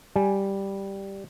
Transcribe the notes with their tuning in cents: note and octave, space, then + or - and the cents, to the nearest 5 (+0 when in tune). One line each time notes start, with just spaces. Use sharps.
G3 +0 G#5 +0